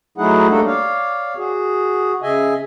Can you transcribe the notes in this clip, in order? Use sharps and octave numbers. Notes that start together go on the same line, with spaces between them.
F#3 A3 D#4 E4 G#4 F#5
G3 A3 A#3 D4 D#4 A4
C#5 D5 F5
F#4 G#4
C#3 G#4 D#5 E5 G#5